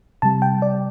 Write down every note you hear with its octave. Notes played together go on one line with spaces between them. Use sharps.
C3 G3 A5
G5
D5